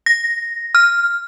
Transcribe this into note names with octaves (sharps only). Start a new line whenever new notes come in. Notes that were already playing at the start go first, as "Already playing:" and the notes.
A#6
F6